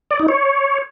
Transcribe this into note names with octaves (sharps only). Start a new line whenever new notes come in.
D5
D#4
C#5